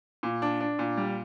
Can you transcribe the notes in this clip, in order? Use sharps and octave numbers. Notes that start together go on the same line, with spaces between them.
A#2
D4
D4
A#2
G3